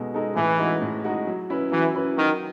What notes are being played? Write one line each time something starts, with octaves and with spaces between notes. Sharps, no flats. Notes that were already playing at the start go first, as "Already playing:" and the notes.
Already playing: B2 G#3 D#4 A4
G#3 D#4 A4
A2 E3
G#3 D#4 F#4
A2
G#3 D#4 F#4
F#3
C#4 E4 B4
E3 F#3
C#4 E4 B4
D#3 F#3